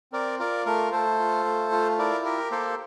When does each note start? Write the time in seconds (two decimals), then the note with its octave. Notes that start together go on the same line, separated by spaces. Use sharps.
0.13 C4 A#4 D5
0.39 F4 A#4 D5
0.66 A3 A#4
0.92 A3 A4 C5
1.19 F4
1.45 A3
1.72 F4
1.98 E4 A#4 D5
2.25 G4 A#4
2.51 A#3 A4 C5